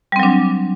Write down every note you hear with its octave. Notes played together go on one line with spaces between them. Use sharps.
F#3 G3 C4 D4